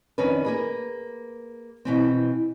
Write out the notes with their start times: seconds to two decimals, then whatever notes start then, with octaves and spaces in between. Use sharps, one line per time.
0.18 F2 D#3 C#4 D4 B4
0.44 A#3 G#4 B4
1.85 B2 E3 C4